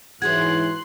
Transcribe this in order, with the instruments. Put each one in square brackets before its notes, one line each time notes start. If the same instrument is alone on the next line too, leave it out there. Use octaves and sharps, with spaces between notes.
[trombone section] G#2 E3 [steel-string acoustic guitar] F#4 G#4 C#5 [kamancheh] C6 F#6 [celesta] G#6